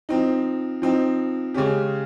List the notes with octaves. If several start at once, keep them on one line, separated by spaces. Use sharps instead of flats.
F3 C4 D#4
F3 C4 D#4
C#3 G#3 C#4 G4